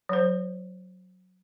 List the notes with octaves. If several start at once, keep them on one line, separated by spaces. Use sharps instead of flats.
F#3 C5